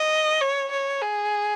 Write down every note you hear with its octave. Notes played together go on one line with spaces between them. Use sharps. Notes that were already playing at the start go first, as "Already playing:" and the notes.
Already playing: D#5
C#5
C#5
G#4